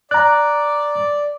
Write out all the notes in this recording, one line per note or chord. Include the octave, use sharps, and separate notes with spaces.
D5 A#5 F#6